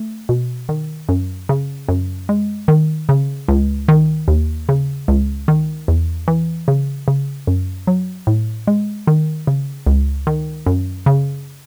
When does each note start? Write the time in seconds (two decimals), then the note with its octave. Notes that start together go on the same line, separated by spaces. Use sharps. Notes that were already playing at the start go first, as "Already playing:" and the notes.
Already playing: A3
0.29 B2
0.69 D#3
1.09 F#2
1.49 C#3
1.89 F#2
2.29 G#3
2.68 D#3
3.09 C#3
3.48 C#2
3.88 D#3
4.28 D#2
4.69 C#3
5.08 C#2
5.48 D#3
5.88 E2
6.28 E3
6.68 C#3
7.08 C#3
7.47 F#2
7.87 F#3
8.27 A2
8.67 G#3
9.07 D#3
9.47 C#3
9.87 C#2
10.27 D#3
10.66 F#2
11.06 C#3